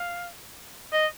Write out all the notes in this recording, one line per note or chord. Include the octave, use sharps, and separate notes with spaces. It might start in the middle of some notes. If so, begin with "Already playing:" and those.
Already playing: F5
D#5